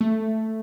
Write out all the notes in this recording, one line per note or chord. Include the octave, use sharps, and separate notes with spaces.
A3